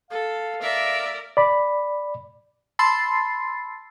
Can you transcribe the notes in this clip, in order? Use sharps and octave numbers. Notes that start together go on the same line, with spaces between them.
A4 F5
A#4 D5 E5
D5 B5
A5 B5 C6 E6 A6 C7